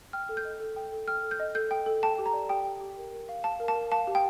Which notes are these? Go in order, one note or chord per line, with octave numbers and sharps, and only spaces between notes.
G5 F6
A4
G6
D#5
A4
G5
A4
G5 F6
A4
G6
D#5
A4 G6
G5
A4
G5 A5
G4
A#5
D5
G4 G5
G5
G4
A#4
A#4
F5
F5 A5
A#4
A5
A#4
F5 A5
G4
G5